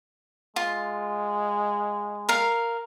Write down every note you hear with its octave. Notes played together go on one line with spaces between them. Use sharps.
G#3 F4
A#4 F5